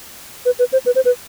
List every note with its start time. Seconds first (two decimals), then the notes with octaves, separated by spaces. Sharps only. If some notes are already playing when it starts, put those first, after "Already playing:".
0.46 B4
0.59 B4
0.73 C5
0.86 B4
0.96 C5
1.05 B4